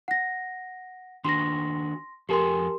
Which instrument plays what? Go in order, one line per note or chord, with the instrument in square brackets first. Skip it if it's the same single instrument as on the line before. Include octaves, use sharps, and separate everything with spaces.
[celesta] F#5 A#6
[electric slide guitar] D#3 D4 F#4 [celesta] C6 A#6
[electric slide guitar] F2 A4 G#5 [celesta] G4 A#4 C6